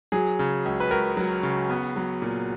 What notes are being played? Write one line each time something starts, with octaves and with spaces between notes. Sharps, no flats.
F#3 G#4
C#3
C#2
B4
C#2 A#4
F#3
C#3
B3
F#3
A#2